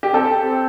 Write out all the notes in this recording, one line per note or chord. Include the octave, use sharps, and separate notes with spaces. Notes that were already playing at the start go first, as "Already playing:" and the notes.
G4
C4 A4
C4